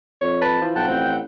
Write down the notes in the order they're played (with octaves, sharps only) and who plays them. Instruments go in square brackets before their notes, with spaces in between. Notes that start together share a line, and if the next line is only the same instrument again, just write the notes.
[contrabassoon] F2 [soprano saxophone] C#5
[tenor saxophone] B4 [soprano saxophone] A5
[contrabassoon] E3 [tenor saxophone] F3
[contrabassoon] B1 [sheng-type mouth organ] F#5 G5 G6 [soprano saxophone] A5
[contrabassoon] A1 [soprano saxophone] C4